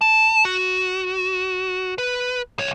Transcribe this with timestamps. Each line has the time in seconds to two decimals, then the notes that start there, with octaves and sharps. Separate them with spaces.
0.01 A5
0.45 F#4
1.98 B4
2.59 C2 C#5